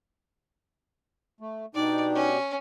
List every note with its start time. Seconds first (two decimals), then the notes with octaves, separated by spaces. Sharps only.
1.40 A3
1.75 B2 D4 D#4 G4 D5
2.15 C#4